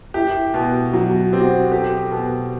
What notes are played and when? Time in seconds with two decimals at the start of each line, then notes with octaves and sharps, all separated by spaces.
0.14 E4 G4
0.54 B2
0.93 F#3 F#4
1.32 C4 G4
1.41 F#4
1.50 G4
1.72 G4 A4
2.11 B2